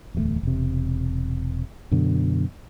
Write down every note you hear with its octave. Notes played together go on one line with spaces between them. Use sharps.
D1 E2 E3 A3
E1 C3
F#2 B2 D3